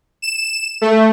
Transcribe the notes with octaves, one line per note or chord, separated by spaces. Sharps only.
E7
A3